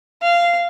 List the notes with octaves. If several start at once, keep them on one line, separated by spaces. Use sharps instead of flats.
F5